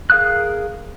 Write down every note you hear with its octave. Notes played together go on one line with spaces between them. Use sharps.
G#4 A#4 F5 D#6 F#6